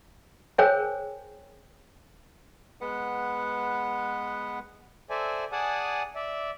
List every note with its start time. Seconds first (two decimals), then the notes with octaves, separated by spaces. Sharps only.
0.58 G#4 A#4 C5 C#5 G5 G#5
2.81 G#3 B3 B4 F#5
5.10 A4 C5 D5 E5 G#5
5.52 G#4 D5 F#5 G#5 A5 D#6
6.15 D5 E5